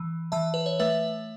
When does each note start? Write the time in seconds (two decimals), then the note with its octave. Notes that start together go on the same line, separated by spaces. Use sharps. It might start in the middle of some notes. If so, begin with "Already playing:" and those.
Already playing: E3
0.32 E3 E5 A5
0.54 B4
0.66 C#5
0.79 A3 B4 E5